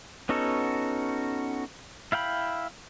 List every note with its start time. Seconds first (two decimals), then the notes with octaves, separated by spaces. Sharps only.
0.29 B3 C#4 D#4 F#4 A4
2.12 E4 F5 G5 B5